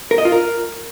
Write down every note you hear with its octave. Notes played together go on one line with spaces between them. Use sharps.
A#4
D#5
F4
A#4